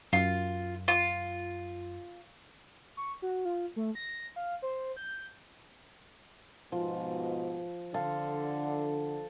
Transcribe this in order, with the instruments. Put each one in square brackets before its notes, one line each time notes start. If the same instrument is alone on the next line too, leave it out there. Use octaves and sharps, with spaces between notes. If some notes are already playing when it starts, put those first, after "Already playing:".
[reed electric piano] F#2 [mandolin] F4
[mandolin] F4
[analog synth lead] C#6
F#4
F4
A3
A#6
F5
C5
G6
[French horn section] G#2 B2 [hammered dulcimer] F3
[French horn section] D3 [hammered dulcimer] A4 C5 F5